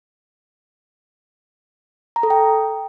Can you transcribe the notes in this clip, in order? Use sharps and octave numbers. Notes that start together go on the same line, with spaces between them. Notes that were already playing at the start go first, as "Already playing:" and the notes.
A#5
A4
G5